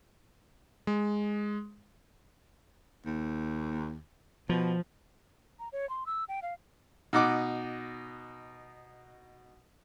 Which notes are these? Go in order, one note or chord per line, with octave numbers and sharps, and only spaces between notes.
G#3
D#2
B2 F3
A#5
C#5
C6
E6
G5
F5
B2 D#4 F#5 D6